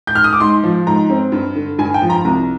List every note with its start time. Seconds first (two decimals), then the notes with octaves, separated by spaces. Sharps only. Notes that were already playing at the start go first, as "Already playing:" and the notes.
0.07 G6
0.15 F6
0.24 D#6
0.33 D6
0.40 G#2 C6
0.64 F3
0.87 G#2 A#5
1.10 C4
1.32 G2
1.55 D3
1.78 G2 G#5
1.94 G5
2.02 F3
2.10 A#5
2.25 C2 A#5